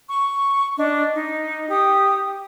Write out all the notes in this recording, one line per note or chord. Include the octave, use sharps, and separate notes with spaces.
C#6
D4 D#5
D#4
G4 D#6